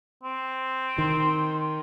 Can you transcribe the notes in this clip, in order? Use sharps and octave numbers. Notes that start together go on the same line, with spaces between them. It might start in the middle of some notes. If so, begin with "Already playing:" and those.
C4
D#3 C6